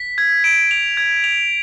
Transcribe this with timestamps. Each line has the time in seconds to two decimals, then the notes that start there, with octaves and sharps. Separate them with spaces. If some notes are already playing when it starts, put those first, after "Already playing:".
Already playing: B6
0.18 G#6
0.44 D7
0.71 F7
0.97 G#6
1.24 F7